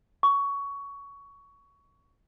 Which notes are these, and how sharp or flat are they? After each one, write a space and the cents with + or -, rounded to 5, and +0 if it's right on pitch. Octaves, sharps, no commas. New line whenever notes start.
C#6 +15